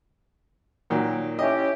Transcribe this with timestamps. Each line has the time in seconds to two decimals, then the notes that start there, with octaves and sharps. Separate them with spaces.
0.90 A#2 D#3 F#3
1.39 C#4 E4 G4 D#5